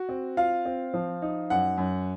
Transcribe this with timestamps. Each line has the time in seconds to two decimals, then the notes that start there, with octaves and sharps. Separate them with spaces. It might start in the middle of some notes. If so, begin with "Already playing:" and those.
Already playing: F#4
0.09 C4
0.37 F4 F5
0.65 C4
0.94 F3
1.22 D#4
1.50 F#2 F#5
1.78 F#2